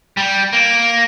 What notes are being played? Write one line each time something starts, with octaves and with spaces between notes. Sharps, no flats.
G3
A#3